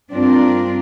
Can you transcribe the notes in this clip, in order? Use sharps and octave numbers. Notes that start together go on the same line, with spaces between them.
G2 C4 D4 F4 A#4